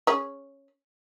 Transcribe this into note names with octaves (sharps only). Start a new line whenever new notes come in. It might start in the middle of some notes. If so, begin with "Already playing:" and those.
C#4 G#4